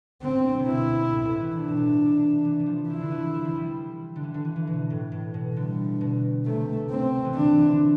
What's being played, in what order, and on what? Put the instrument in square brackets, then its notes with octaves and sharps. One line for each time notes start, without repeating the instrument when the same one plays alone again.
[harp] D3 [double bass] C4
[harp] C3
[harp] B2 [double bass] E4
[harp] A2
A2
E3
[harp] C3 [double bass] D4
[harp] B2
C3
E3
E3
F3
[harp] F3 [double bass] E4
[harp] D3
E3
F3
F3
G3
D3
E3
D3
E3
E3
B2
A2
A2
B2
[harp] D3 [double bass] G3
[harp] B2
[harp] C3 [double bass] A3
[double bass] C4
[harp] E3
[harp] D3 [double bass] D4
[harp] E3